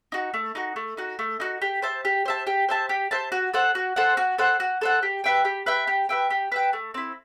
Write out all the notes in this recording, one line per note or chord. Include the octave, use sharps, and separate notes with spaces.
D#4 F#4
A3
D#4 F#4
A3
D#4 F#4
A3
D#4 F#4
G4
C5 E5 A5
G4
C5 E5 A5
G4
C5 E5 A5
G4
C5 E5 A5
F#4
A4 C5 F#5
F#4
A4 C5 F#5
F#4
A4 C5 F#5
F#4
A4 C5 F#5
G4
B4 E5 G5
G4
B4 E5 G5
G4
B4 E5 G5
G4
B4 E5 G5
A3
C4 E4